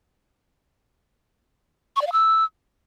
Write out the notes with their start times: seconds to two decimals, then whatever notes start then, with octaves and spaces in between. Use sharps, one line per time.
1.96 C#6
2.02 D5
2.07 F5
2.12 E6